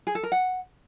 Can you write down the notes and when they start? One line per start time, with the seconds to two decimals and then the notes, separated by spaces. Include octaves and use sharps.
0.07 G#4
0.15 A4
0.23 A#4
0.32 F#5